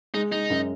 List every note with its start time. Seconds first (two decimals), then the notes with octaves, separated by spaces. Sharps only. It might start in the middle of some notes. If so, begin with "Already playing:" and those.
0.14 G#3 D#4
0.32 G#3 D#4
0.50 F#2